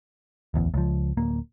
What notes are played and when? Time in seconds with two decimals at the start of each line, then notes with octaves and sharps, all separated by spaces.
0.54 D1 A1 E2
0.74 C#2 F3
1.17 D1 A#3